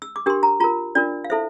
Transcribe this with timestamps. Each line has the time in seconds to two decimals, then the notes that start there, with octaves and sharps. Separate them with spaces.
0.02 E6
0.16 D6
0.26 D4 G4 A#4 C6
0.43 A#5
0.60 F4 A#4 A#5
0.95 D4 F4 A#4 D5
1.24 F5
1.30 E4 A4 C5 E5